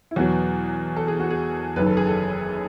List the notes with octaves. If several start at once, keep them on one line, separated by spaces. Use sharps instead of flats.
E4
E2 B2 F#3 F#4
A4
G#4
F#4
G#4
F#1 F#2 D#3 B4
A4
G#4
A4